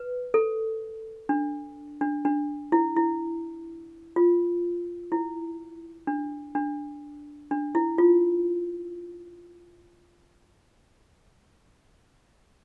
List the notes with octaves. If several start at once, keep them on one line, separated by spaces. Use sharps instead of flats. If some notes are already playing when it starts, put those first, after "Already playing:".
Already playing: B4
A4
D4
D4
D4
E4
E4
F4
E4
D4
D4
D4
E4
F4